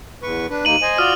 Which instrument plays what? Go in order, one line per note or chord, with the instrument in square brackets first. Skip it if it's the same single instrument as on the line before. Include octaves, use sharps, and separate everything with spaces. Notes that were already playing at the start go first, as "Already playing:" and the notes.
[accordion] E2 B4 C#6
D4 B4
[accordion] D#2 A#3 D#4 [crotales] D#7 F#7
[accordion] C5 D#5 G#5
[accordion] F4 F#4 D5 [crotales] D#6 F6 D#7